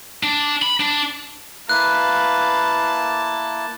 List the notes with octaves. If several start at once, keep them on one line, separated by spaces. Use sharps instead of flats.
D4
B5
D4
A#3 E4 B4 F5 A5 F#6